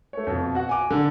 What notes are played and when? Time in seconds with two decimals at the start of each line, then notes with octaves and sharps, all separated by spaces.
0.13 A3 C#5
0.27 F2 B2
0.55 F#4 F#5
0.69 G#5 D6
0.90 D3